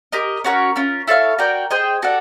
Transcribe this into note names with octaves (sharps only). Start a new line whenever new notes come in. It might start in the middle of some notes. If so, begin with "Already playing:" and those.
G4 A#4 D#5
C#4 F#4 A#4 C#5
C#4 F4 A#4
E4 A4 C#5 F5
F#4 A#4 D5 G5
G#4 C5 D#5 G5
F#4 A4 D5 F#5